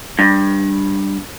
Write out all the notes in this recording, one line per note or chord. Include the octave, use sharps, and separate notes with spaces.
G2